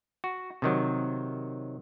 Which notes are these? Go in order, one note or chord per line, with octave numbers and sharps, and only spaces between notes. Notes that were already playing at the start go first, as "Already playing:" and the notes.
F#4
C3 D#3 F#3